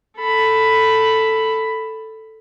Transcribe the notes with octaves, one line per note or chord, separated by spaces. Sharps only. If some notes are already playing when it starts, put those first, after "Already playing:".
A4 B5